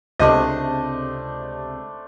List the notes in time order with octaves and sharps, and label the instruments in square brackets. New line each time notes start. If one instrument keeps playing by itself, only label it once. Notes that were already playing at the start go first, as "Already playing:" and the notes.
[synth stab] C#2 C3 [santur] A3 D4 C5 [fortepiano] D#5